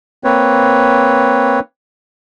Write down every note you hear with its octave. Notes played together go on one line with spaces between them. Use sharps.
A#3 C4 B4 C#5